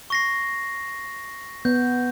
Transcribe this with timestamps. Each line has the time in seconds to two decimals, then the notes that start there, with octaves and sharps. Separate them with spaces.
0.10 C#6 A#6 C7
1.65 B3 G6